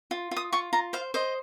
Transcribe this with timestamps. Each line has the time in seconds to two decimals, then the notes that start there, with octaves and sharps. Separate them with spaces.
0.11 F4
0.31 F4
0.36 D#6
0.52 F4 C#6
0.73 F4 A#5
0.93 C5 F5
1.14 C5 D#5